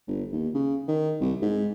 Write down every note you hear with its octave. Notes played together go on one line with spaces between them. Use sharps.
G1
D#2
C#3
D#3
C2
G#2